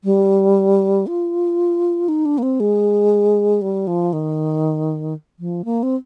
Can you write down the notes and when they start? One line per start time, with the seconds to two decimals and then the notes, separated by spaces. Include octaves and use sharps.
0.04 G3
1.07 F4
2.09 D#4
2.25 D4
2.38 A#3
2.43 C4
2.60 G#3
3.62 G3
3.87 F3
4.13 D#3
5.39 F3
5.65 A#3
5.83 C4